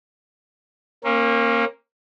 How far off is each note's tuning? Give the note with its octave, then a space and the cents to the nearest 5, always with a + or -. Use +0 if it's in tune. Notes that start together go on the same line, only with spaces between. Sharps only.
A#3 -5 C#4 -40